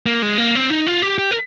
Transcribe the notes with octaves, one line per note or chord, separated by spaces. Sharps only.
A#3
G#3
A#3
C4
D#4
F4
G4
G4
A#4